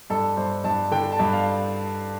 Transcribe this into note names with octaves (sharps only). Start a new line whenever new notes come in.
G2 A4
G2 C5
G2 A5
D3 G5
A5
G2
F5